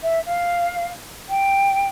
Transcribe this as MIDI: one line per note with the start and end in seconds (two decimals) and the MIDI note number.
0.03 0.19 76
0.26 0.88 77
1.29 1.86 79